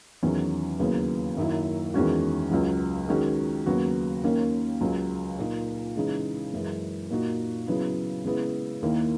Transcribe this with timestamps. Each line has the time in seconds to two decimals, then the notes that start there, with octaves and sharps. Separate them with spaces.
0.23 E2 D#3 F#3 C#4 G#4
0.79 D#2 C#3 F#3 B3 E4
1.37 F#2 D#3 F#3 A#3 E4
1.94 E2 D#3 G#3 C#4 F#4
2.51 C#2 C#3 F#3
3.09 D#3 G#3 C#4 F#4
3.66 D#2 C#3 F#3 B3 F#4
4.24 D#2 D#3 A#3 C#4
4.81 C#2 C#3 F#3
5.39 A#2 A#3 D#4
5.96 C#3 E3 G#3 D#4 G#4
6.53 F#2 E3 G#3
7.10 A#2 A#3 D#4 F#4
7.67 C#3 F#3 B3 E4
8.25 C#3 G#3 B3 E4
8.82 D#2 D#3 A#3 E4